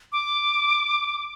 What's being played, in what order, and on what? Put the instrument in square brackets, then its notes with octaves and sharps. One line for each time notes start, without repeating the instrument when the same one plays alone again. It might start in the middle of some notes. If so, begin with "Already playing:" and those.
[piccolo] D6